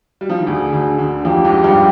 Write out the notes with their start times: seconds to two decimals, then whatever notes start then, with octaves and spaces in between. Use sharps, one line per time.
0.21 G3
0.29 F3
0.38 D#3
0.46 D2 D3 G#4
0.73 D2 D3
0.99 D2 D3
1.25 F2 F3 G4
1.45 G#2 G#3
1.64 G2 G3